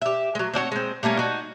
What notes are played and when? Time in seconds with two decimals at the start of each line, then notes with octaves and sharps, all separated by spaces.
0.02 G4 E5
0.35 F#3 G#3
0.54 C4 D4 F#4 C#5
0.72 G#3 C4
1.03 G3 A3 A#3 C#4
1.19 D#4 F#4